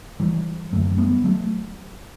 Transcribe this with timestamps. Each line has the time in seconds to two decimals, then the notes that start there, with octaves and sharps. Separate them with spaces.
0.20 E3 G3
0.72 F#2 D3 F#3 A3
0.98 G3 B3
1.24 F#3 A3